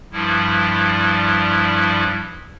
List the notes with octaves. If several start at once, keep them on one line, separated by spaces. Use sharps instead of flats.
G2 F3 G3 E4